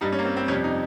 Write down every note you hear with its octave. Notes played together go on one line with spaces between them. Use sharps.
G2 G3 D#4
C#4
A#3
C4
C4
F2 C3 G3 C#4
D#4